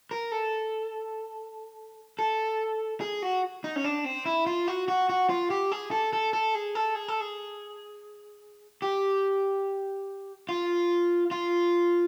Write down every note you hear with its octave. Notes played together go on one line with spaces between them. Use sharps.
A#4
A4
A4
G#4
F#4
D#4
C#4
D4
C4
E4
F4
F#4
F#4
F#4
F4
G4
G#4
A4
A4
A4
G#4
A4
G#4
A4
G#4
G4
F4
F4